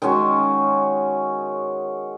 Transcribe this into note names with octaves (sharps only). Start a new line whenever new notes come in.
D#3 G#3 C#4 F#4